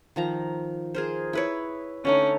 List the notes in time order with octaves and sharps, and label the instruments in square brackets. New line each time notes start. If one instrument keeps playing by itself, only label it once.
[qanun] D#3 F3 A#5
G#4 A#4 C5
E4 B4 C#5
[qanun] D3 A3 D#4 [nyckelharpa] C#4